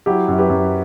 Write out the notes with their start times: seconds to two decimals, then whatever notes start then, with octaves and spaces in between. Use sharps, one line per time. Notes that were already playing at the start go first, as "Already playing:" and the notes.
0.06 F#3 E4 G4
0.28 F#2
0.38 G4 B4
0.50 F#2